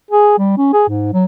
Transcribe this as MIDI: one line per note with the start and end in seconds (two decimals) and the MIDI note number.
0.11 0.37 68
0.39 0.58 55
0.58 0.71 61
0.73 0.86 68
0.88 1.13 44
1.13 1.25 54